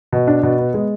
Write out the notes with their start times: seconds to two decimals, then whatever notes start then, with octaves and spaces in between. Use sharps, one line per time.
0.13 B2
0.27 D4
0.43 B2
0.59 B3
0.74 G#3